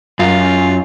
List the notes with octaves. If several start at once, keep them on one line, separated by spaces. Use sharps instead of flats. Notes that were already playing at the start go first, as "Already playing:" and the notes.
F#2 F4